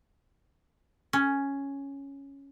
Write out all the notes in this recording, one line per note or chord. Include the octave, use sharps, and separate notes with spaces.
C#4